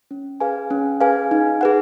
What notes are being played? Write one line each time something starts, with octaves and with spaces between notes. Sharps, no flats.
C#4
G#4 B4 F5 G#5
C#4
G#4 B4 F5 G#5
D#4
G#4 B4 F#5